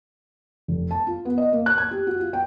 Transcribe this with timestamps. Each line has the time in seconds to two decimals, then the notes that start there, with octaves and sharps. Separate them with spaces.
0.68 F1
0.91 A5
1.07 F4
1.25 B3
1.38 D#5
1.52 A#3
1.66 F#6
1.78 G#6
1.91 G4
2.07 F#4
2.20 F4
2.33 G5